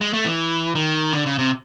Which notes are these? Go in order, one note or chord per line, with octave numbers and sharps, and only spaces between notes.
G#3
A3
E3
D#3
D3
C#3
C3